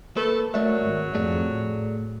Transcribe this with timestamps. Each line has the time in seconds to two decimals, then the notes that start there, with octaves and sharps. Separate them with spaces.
0.16 A#3 A4 B4
0.54 F#3 A3 A#4 D5 E5
0.83 G#1
1.15 F2 A3 G#4 D5
1.47 A2